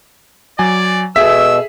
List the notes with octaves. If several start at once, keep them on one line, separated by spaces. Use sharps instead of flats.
F#3 D5 G#5
B2 G#4 A4 E5 E6 B6